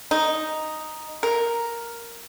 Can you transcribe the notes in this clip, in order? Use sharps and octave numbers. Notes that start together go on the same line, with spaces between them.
D#4
A#4